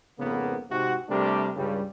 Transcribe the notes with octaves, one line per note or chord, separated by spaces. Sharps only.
F2 G#2 C#3 A#3 B3
G#2 C3 F#4
C3 G3 A3 D4 G4 A#4
C#2 G2 C#3 G3